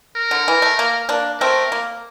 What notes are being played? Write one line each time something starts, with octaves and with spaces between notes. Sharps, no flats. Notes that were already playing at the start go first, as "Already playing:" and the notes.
A#4
D3
E3
A3
A#3
A#3 D4
A3 C4 A#4
A#3